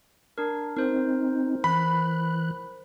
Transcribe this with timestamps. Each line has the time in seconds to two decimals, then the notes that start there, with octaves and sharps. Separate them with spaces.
0.38 D4 A#4
0.77 C4 D#4 A#4 C5
1.64 E3 B5 F#6